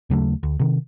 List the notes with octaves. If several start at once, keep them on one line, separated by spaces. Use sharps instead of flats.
D#2 C#3 F#3 A3
D2
C3 D#3